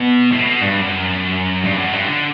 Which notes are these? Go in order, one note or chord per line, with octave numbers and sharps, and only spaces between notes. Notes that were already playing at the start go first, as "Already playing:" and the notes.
Already playing: B2
A2
B2
G2
F#2
G2
F#2
G2
D3